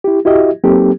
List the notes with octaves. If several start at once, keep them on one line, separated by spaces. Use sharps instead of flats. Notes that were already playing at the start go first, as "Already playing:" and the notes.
E4 G4
E4 F#4 G4 D#5 E5
F#3 A#3 C4 D#4 G4 A4